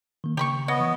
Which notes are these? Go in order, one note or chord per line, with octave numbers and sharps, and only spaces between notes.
D#3 A#3
C#3 G4 B5 C#6
B3 C#5 D#5
E3